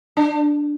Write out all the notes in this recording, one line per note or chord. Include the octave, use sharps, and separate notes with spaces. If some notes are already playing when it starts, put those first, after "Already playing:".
D4